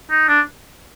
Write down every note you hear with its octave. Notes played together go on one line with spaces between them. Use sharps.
D#4
D4